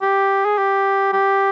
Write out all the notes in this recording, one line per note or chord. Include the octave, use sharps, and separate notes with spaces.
G4
G#4
G4
G4